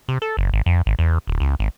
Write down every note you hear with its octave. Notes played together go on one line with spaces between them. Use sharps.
C3
A4
F#1
G#1
F2
G#1
E2
D1
C#2
G#1